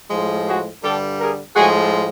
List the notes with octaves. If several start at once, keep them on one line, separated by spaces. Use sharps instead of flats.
A2 F3 G#3
F#4 G#4
G2 D3 G3 G4 A4
G#4 A#4
A2 F3 G#3 F#4 G#4